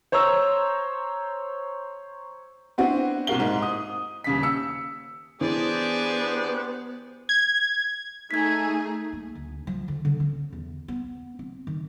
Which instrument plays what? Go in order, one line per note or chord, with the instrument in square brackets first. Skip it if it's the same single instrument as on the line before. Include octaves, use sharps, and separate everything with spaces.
[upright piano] C5 C#5 A#5 E6
B3 C4 D4 E4 F#4 C5
C2 A#2 F#4 A#4 F5 G7
G#2
D#6
D#1 C#3 B6
E6 C#7
[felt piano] E3 [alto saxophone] B3 [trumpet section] D4 G4 C5 [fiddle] G#4 D5
[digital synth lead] G#6
[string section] A3 G#4 [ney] D#4 [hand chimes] G#6 B6
[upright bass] A#3
D2
F3
D3
D3
C#4
E2
B3
C4
D#3